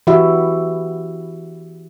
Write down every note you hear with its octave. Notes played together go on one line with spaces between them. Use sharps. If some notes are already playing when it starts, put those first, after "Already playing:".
E3 E4 F#4 G4 E5